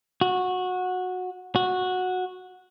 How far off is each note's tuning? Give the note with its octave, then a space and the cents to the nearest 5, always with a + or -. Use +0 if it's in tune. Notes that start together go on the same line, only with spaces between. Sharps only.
F#4 -15
F#4 -10